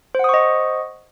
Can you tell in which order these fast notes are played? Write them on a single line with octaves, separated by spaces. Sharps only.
C5 F#5 D#6 C#6 D#5